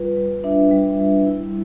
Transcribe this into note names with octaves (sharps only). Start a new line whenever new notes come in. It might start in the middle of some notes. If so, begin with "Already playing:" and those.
Already playing: G3 F4 B4
G3
D4 E5
G3
G3
E4